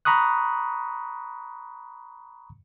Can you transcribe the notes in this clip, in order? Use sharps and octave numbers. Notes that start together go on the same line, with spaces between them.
A#5 B5 C#6 D#6 F#6